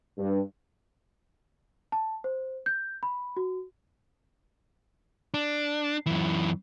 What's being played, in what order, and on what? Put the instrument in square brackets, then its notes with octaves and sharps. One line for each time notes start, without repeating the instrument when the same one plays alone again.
[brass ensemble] G2
[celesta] A5
C5
G6
B5
F#4
[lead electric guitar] D4
F#2 E3